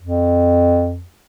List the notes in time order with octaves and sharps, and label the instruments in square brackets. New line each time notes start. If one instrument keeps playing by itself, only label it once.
[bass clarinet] F2